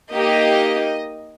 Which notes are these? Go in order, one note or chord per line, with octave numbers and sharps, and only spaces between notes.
A#3 D#4 G4 D#5